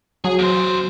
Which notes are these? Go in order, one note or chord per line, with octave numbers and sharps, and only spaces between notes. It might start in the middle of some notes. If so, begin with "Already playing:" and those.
F#3 G#4
E2 C5